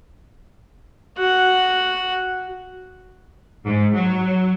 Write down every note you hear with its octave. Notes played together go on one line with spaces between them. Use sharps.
F#4 F#5
G#2
F#3